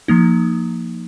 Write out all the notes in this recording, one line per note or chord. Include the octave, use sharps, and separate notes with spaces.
F3 A#3 D#4